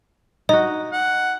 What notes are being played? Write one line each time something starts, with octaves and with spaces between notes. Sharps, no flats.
D#4 F#4 D#5
F#5